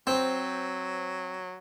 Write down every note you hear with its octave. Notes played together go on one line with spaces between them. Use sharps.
F#3 C4 C5